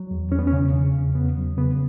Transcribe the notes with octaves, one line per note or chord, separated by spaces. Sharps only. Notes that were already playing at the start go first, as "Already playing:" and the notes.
Already playing: F#3
E2
E2 C#4
B3
C#4
C#3
C#3
E2
E2 B3
F#3
C#3 B3